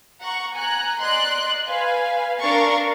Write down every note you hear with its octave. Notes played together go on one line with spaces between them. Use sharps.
F#5 A#5 C#6
G#5 A#5 F#6
D5 D#5 C6 F#6
B4 F5 G#5
D4 A#4 F5 A#5 C#6 A6